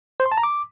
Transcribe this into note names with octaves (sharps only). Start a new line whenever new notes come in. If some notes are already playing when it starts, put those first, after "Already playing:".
C5
C6
A5
A#5
D6